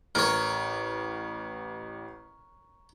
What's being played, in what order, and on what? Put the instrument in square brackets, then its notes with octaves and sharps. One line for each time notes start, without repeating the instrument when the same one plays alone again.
[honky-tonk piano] A1 [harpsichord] A#4 C#5